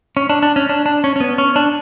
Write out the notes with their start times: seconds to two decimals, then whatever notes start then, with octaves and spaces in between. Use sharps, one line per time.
0.17 C#4
0.30 D4
0.43 D4
0.56 C#4
0.69 D4
0.86 D4
1.04 C#4
1.16 C#4
1.20 B3
1.38 C#4
1.56 D4